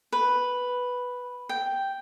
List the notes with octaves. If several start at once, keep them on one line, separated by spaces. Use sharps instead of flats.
B4
G5